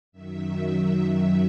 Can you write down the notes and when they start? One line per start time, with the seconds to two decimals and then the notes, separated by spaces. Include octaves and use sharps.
0.12 F#2 D#3 F#3 E5